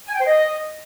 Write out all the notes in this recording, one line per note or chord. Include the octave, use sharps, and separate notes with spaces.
G#5
G5
C5
D#5